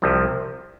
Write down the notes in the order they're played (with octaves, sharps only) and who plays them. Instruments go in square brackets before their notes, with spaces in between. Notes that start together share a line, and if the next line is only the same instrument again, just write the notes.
[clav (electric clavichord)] C2 C3 F3